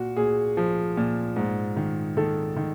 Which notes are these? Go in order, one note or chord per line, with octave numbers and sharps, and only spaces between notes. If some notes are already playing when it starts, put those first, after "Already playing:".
Already playing: A#2 F#4
A#2 G#4
F3
A#2
G#2
D#3
D#3 A4
D#3